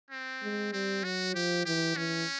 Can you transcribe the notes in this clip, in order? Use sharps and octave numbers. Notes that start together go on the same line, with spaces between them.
C4
G#3
G3 C4
F#3 F#4
F3 G4
E3 G4
E3 C#4